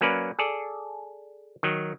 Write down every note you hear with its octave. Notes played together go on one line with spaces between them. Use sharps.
F#3 A#3 C#4 B4 D5
G#4 A4 D5
D#3 F#3